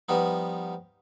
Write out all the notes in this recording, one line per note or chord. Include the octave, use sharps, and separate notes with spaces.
F3 G3 B3 D#4